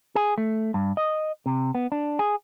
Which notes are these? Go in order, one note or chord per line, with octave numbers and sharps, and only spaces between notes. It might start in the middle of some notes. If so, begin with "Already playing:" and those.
G#4
A3
G2
D#5
C3
B3
D4
G#4